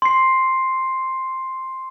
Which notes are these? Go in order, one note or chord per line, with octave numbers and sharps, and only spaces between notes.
C6 C7